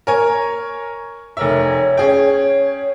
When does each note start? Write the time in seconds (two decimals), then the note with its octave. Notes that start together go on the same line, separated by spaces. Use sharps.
0.07 A#4 C#5 G#5
1.37 F1 A#4 C#5 E5
1.97 C#4 G#4 G5